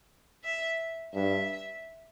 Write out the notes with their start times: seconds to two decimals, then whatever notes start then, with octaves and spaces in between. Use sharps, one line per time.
0.44 E5
1.14 G2 E5